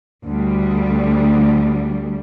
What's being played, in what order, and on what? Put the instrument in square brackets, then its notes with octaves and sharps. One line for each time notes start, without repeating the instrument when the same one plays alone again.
[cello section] D2 G3